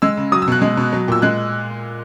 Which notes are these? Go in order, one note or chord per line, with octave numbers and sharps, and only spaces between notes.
G#3 E6
C#3
F#3 D#6
E6
B2 F#6
G#3
B2
F#3
A#2 E6
G#3 F#6